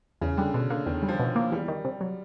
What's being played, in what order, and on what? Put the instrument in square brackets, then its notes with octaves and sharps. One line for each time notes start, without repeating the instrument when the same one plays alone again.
[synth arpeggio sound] E2 [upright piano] C#3
[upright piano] D3 [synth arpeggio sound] G3
[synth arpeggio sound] B2 [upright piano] D3
[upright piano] D3 [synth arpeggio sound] A#3
[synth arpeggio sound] E2 [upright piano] D#3
[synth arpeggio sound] G3
[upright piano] F3
[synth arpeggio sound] B2
A#3
[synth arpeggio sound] E2 [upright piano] G3
[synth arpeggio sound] D#3
C3
F#3